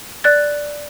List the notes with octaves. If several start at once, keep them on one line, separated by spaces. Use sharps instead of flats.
D5 F#6 A6